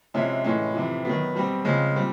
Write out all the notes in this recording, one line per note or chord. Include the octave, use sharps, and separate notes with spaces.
C3 F3 G#3 C#4 E4
A2 E3 G#3 C#4
F2 C3 E3
D#3 F#3 B3
B2 G3 C4
C#3 F3 G#3 C4
A#2 G3 C4